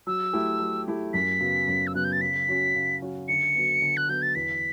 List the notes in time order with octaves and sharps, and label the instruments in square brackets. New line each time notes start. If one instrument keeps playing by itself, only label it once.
[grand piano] F#3 [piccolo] E6
[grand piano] A3 E4 G4
F#3
A3 E4 G4
[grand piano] F#2 [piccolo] B6
[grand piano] C#3 F#3 B3
F#2
[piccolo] E6
[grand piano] C#3 F#3 B3 [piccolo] F#6
[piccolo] G6
A6
[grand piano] C#3 [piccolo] B6
[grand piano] F#3 C#4 F#4
C#3
F#3 C#4 F#4
[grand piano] D3 [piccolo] C#7
[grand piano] F#3 B3
D3
[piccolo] F#6
[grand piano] F#3 B3 [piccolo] G6
[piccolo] A6
[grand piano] E2 [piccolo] B6